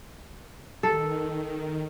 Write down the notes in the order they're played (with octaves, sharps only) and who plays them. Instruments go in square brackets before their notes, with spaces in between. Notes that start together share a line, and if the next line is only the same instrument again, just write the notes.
[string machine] D#3 [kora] A4